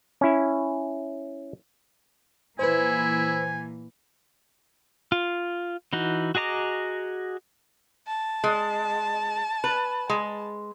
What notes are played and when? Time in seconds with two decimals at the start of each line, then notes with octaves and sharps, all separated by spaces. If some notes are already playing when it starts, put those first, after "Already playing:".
0.21 C#4 E4
2.59 A#2 E3 A#3 E4 B4 C5 G#5
5.12 F4
5.93 E3 D#4 F#4
6.35 F#4 G#4 D#5 A#5 D6
8.07 A5
8.44 G#3
9.64 B4
10.09 G#3